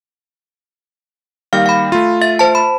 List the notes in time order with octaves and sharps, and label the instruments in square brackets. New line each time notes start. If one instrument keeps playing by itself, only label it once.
[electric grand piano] D#3 G3 A#3 [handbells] F5 F6
[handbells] F5 B5
[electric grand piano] A3 F4
[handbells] E5 A6
C5 A5
B5